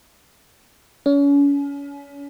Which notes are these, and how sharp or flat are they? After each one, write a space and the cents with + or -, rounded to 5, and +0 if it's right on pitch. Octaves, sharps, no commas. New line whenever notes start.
C#4 +35